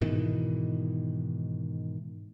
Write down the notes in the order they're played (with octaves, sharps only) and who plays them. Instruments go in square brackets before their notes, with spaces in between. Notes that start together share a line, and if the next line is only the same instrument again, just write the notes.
[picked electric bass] G#2 B2 D#3 E3